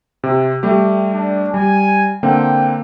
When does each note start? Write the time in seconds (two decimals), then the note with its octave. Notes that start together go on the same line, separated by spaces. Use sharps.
0.24 C3
0.63 G3 A3 G4
1.13 D4
1.54 G3 G#5
2.23 D3 A#3 C4 G5